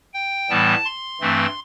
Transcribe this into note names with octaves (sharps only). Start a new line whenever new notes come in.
G5
A2 E3 G3 B3 A5
C6
G2 E3 A3 C4